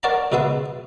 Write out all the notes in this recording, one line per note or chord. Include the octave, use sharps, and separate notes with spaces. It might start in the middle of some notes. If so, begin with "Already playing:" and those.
A#4 C#5 D5 F#5 A5 A#5
C#2 B2 B4 E5 C6 D#6